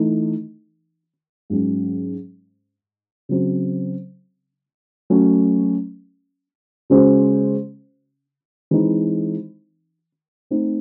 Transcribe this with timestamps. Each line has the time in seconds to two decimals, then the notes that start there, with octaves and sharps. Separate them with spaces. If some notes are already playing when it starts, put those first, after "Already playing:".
Already playing: E3 A3 D#4
1.50 G#2 F#3 C#4
3.29 C#3 F#3 C4
5.10 F#3 A3 C#4
6.90 C#3 G#3 C#4 F#4 C5
8.71 E3 G#3 C4 D#4
10.50 A3 C4 D#4